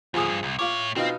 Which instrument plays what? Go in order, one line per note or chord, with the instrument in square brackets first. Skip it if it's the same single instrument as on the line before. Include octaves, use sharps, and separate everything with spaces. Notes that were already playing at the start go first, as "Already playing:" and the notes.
[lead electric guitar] D2 A2 [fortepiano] F3 G#4 D#6
[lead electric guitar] G2
C2
[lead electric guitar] A2 C#5 [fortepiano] F4 D6
[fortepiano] B2 D#4 F4 [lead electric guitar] C4